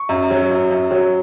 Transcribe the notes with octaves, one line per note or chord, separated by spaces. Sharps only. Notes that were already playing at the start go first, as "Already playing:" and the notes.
Already playing: C#6
F#2
F#3
F#2
F#2
F#3